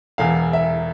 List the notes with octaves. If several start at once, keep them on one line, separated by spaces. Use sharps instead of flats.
E1 E2 E3 F5
E5